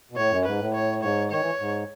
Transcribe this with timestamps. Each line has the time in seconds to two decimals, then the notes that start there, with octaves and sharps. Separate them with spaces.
0.11 B2
0.16 A2 C#5
0.30 F#2
0.45 G#2 B4
0.60 A2
0.74 C#5
1.02 G#2 C#5
1.31 D#3 C#5
1.41 E3
1.60 G#2